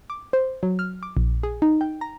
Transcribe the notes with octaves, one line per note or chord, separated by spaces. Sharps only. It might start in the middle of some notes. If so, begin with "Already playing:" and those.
D6
C5
F#3
F6
D6
A#1
G#4
D#4
G5
A#5